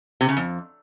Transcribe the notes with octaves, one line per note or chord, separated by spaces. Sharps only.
C3
C#3
F2